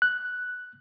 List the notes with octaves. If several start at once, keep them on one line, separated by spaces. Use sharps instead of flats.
F#6